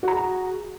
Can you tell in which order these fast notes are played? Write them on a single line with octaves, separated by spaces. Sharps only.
F#4 A#5 G#4